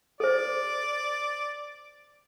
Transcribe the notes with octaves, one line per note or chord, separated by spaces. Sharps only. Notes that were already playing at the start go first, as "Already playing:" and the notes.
A4 C5 D5